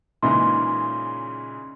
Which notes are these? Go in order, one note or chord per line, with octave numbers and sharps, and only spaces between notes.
A#2 C#3 E3 G#3 D#4 E4 C6